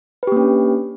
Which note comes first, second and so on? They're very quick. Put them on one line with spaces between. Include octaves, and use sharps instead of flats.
B4 G4 A#3 C#4 D4